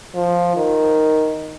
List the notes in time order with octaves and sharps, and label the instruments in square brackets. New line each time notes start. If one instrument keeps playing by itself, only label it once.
[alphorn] F3
D#3